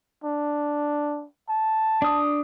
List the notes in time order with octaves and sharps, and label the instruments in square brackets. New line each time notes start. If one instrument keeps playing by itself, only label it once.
[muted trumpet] D4
A5
[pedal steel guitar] D4 D#6